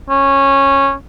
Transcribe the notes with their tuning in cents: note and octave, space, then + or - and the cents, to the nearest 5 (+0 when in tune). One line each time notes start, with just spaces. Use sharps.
C#4 -15